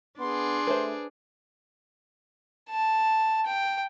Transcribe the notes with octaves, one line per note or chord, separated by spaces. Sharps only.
B3 D4 G#4 C6
A3 B4 C5
A5
G5